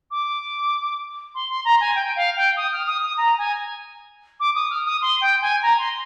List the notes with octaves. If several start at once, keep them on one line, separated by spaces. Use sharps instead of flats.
D6
C6
C6
A#5
G#5
G5
F5
G5
D#6
F6
D#6
D#6
A#5
G#5
D6
D#6
F6
D#6
C6
G5
G#5
A#5
C6